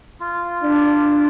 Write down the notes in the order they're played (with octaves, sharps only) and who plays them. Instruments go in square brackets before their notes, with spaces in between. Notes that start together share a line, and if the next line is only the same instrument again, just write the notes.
[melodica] F4
[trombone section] D4